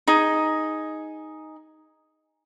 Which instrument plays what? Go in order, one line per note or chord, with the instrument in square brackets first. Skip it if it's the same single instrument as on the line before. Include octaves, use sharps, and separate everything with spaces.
[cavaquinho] D#4 G#4